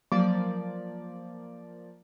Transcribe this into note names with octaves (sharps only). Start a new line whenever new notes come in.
F3 F#3 A#3 D5